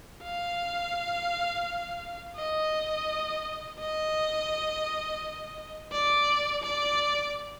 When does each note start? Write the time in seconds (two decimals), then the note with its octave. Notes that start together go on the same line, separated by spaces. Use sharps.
0.24 F5
2.37 D#5
3.79 D#5
5.92 D5
6.64 D5